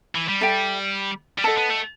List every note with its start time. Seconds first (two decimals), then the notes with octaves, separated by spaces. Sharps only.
0.15 E3
0.28 G3
0.41 A4 E5 G5
1.38 G3
1.44 A3 A4 D#5 F#5 A5
1.58 B3
1.70 A3